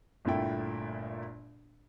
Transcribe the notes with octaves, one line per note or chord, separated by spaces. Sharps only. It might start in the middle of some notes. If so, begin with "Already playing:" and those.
G1 A#2 A3 E4 G5